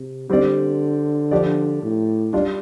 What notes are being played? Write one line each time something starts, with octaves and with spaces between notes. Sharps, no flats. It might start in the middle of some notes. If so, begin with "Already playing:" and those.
Already playing: C3
D3 G3 C4 G4 D5
F3 D4 G4 D5
A2
G3 D4 F4 D5